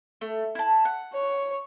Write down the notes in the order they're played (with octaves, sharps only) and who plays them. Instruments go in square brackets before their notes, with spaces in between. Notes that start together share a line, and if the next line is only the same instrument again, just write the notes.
[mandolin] A3
E4 A5
F#5
[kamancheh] C#5